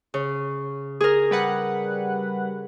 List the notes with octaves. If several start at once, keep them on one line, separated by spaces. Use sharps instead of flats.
C#3
G#4 A#4
G3 B4 F#5